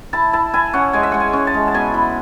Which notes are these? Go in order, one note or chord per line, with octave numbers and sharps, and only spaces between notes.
E4 A5
E4 A5
E4 G#5
C#4 F#5
G#3 G#5
E5
G#3 F#5
G#5
C#4
A5
G#3
A5
B2 G#5
E4